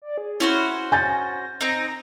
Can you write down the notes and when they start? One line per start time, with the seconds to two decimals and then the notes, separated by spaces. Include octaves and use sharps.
0.02 D5
0.18 G#4
0.40 C#4 E4 F#4 C5
0.92 G#5 G6 A6 A#6
1.61 C4 D#4 A#5